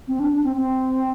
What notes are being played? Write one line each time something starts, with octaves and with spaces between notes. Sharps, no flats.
C4
D4
D4
C4
C4